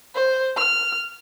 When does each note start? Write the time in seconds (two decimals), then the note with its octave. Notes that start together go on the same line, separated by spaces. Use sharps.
0.15 C5
0.57 F6